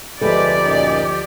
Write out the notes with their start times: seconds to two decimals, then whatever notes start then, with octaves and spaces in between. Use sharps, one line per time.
0.21 D2 C3 F3 G#3 G4 A4 B4 D5
0.64 F#2 A#2 D#4